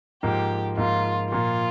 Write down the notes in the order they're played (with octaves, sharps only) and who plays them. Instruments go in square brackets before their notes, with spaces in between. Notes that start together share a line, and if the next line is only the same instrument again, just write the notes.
[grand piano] G#2 F3 A#3 [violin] G4
[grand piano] G#2 F3 A#3 [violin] F4
[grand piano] A#2 F3 A#3 [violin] F4